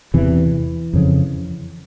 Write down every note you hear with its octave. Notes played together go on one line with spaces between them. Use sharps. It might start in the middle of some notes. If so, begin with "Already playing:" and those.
E2 C3 E3
F2 C#3